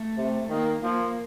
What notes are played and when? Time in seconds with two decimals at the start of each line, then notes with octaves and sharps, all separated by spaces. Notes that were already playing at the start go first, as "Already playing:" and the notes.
Already playing: A3
0.18 C3
0.50 D#3 A#3
0.82 F3 A#3